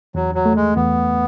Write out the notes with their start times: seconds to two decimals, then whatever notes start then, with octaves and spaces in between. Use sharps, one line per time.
0.15 E2 F#3
0.35 F#3
0.46 A3
0.56 G#3
0.76 E2 B3